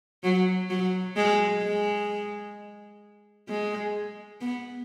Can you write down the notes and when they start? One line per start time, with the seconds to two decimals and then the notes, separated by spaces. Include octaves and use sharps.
0.23 F#3
0.70 F#3
1.16 G#3
1.63 G#3
3.48 G#3
4.41 B3